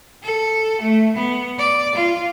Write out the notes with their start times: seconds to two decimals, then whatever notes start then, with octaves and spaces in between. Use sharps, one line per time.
0.23 A4
0.82 A3
1.17 B3
1.58 D5
1.96 F4